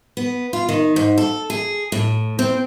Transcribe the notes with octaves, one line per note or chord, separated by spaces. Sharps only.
B3
F4
D#3
G#2
A4
G#4
A2
C4